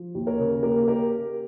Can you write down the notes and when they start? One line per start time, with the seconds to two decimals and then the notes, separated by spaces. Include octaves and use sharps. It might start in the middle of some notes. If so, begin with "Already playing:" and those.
Already playing: F3
0.15 D#2
0.27 A#4 C#5
0.39 C#3
0.63 A#3 G4 A#4
0.88 G4 A#4